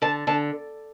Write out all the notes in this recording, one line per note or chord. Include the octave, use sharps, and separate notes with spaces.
D3 A5
D3 A5